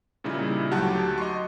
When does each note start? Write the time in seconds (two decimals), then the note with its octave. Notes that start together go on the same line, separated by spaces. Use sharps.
0.24 A#2 C#3 G3 D#4 E4
0.71 D2 F#3 F#4 G4 F#5 A5
1.18 D#5 C6 C#6